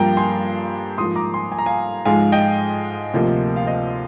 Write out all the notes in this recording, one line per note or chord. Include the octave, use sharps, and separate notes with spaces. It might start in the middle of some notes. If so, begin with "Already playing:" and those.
Already playing: G2 F3 A#3 G5 A#5
G#5 C6
G#2 F3 A#3 C6 D#6
A#5 D6
G#5 C6
G#5
A#5
F5 G#5
G#2 F3 G#3 F5 G#5
D#5 G5
D2 C3 F3 A#3
F5
C5 D#5